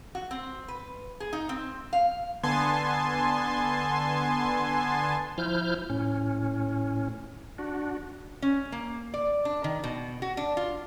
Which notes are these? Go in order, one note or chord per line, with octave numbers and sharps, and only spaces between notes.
F#4
C4
B4
G#4
D#4
C4
F5
D3 B3 G#5 A5 C6
F3 E4 F6 G6
A2 C#4
D4 F#4
C#4
A#3
D5
D4
D#3
B2
F#4
D4
F4